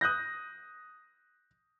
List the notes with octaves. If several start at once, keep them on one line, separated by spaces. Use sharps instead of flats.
D#6 F#6 G6 A#6